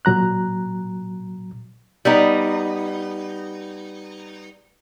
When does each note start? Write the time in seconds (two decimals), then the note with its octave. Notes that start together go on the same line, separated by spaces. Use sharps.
0.05 A#2 F#3 A#5 F#6
2.05 G3 B3 D#4